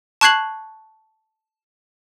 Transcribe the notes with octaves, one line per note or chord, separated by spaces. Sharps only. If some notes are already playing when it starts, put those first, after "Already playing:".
A5 C#6 F#6 G#6 C7 F#7